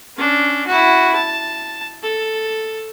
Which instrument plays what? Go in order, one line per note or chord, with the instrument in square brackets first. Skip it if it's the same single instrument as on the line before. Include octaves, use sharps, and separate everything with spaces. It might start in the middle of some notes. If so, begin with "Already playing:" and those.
[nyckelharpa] C#4 D4
E4 F#4
A5
A4